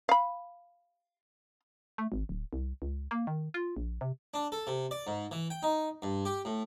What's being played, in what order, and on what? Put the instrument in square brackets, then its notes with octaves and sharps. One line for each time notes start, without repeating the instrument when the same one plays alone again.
[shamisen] F5 B5
[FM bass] A3
G#1
D1
C2
C#2
A#3
D#3
F4
A#1
C3
[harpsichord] D4
A4
C3
D5
G#2
E3
G5
D#4
G2
G4
A2